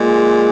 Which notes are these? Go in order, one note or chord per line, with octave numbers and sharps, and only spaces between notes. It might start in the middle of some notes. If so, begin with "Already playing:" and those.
Already playing: A#2 G#3